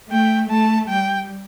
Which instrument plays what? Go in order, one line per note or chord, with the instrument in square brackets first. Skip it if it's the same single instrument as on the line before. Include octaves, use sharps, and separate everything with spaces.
[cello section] A3 [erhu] G5
[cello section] A3 [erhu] A5
[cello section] G3 [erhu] G5